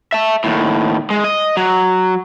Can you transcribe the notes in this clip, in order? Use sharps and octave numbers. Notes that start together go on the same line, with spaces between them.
E5 A5
D#2 A2
G#3
D#5
F#3